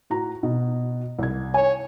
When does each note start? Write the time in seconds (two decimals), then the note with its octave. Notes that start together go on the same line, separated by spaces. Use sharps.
0.10 A2 F#4 A#5
0.43 B2
1.19 C2 G#6
1.54 C#5 G#5